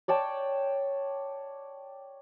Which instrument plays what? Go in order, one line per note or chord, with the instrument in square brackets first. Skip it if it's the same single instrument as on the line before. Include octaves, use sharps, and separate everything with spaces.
[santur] C#5 D5 G5 A5